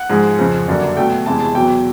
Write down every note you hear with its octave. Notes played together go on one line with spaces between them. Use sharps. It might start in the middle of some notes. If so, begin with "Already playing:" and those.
Already playing: F#5
G#2 F3 G#3
F2 C#3 F3
F#2 D3 G3 A#3
B2 F#3 A3 G5
E2 C3 E3 G#3 A5
A5
E2 B2 F#3 G5